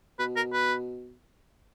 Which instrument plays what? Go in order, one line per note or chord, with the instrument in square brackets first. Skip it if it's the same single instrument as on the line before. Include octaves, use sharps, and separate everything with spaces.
[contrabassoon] B2 [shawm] B4
[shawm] A#4
B4